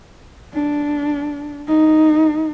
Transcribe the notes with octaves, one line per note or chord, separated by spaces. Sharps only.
D4
D#4